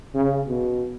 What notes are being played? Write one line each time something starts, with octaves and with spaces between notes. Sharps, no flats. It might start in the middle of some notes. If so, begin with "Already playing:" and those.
C#3
B2